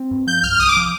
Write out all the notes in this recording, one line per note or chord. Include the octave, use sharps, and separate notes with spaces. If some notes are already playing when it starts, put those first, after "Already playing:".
Already playing: C4
G2
F3 G6
C2 F6
C2 D#6
D6
F3